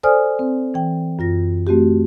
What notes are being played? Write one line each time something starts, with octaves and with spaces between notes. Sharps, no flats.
A4 C5 D5 G#5 D#6 F6
C4
E3 G5
F#2 F4 A#6
A3 C4 F#4 G4